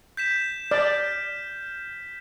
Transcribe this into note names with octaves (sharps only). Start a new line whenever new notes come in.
G6 B6 E7
D5 F6